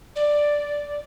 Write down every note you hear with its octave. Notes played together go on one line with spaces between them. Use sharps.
D5